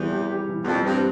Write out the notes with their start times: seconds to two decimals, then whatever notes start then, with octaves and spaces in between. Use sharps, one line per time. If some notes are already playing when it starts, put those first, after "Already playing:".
Already playing: E2 E3 G3 C4
0.10 G4
0.30 G4
0.48 E3
0.63 E2
0.67 F2 G3
0.85 G2 C4